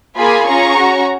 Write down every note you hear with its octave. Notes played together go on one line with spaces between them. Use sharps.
A#3 F4 G#4 G#5 B5
C#4 F4 G#4 A#5 C#6
C#4 F#4